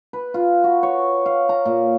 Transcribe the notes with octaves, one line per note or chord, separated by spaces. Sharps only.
B4
F4
F#4
C#5
F5
A#5
A#2